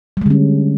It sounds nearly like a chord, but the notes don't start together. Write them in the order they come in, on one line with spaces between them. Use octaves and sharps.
G3 G#3 D3 C#4